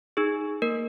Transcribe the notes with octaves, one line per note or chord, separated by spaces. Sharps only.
D#4 G#4
A#3 A#4